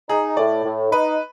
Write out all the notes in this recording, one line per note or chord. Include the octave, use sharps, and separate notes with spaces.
D#4 G#4
A2 D5
A2
D#4 B4